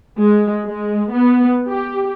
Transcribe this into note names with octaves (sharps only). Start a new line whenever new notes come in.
G#3
G#3
B3
G4